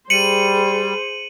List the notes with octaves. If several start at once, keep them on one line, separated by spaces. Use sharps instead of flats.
G3 G#4 C5 C#7 D#7 F#7